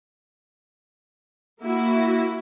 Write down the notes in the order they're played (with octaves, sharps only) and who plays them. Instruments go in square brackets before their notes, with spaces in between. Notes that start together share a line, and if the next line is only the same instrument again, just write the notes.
[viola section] A#3 E4 F#4